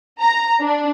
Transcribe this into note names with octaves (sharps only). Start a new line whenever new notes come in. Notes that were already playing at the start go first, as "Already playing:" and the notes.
A#5
D4